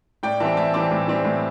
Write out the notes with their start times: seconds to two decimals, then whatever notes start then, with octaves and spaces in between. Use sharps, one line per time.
0.23 A2 D5 G5
0.40 E3 G3 C4 E5 A5
0.57 A2 E5 A5
0.74 E3 G3 C4 A5 D6
0.91 A2
1.08 E3 G3 C4
1.25 A2